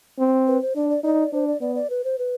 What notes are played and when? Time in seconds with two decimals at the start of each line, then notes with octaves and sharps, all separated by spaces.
0.19 C4
0.47 B4
0.62 C5
0.76 D4 D5
0.90 D5
1.04 D#4 D5
1.33 D4 C5
1.47 D5
1.61 B3 D5
1.75 D5
1.90 B4
2.04 C5
2.19 B4